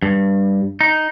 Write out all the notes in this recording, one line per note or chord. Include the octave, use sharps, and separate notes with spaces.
G2
D#4